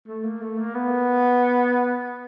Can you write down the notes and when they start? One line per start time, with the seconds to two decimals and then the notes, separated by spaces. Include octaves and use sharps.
0.07 A3
0.24 A#3
0.42 A3
0.58 A#3
0.74 B3